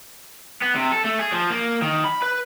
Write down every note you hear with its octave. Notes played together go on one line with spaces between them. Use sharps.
B3
C3
A4
A3
G#4
F3
A#3
D#3
B5
B4